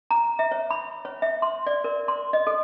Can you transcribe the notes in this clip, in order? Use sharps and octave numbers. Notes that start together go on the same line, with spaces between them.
A#5
E5
C#5
B5
C#5
E5
C6
D5
A#4
C6
D#5
A4